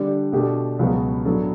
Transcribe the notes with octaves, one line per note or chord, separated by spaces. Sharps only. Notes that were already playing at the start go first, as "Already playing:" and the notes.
Already playing: D3 G3 D4 G4
B2 A3 D4 G4
C#2 B2 F#3 B3 F#4
A2 F#3 B3 D4 A4